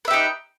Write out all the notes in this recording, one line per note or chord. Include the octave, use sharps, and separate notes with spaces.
D#4 G4 B4 E5